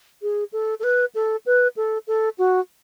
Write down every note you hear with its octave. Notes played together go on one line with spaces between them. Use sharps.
G#4
A4
A4
B4
A4
B4
A4
A4
F#4